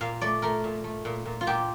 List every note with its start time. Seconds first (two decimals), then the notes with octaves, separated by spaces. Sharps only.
0.01 A#2 F5
0.21 A3 D5
0.42 A3 A#4
0.64 A#2
0.84 A3
1.05 A#2
1.26 A#2
1.41 F4
1.47 A#2 G4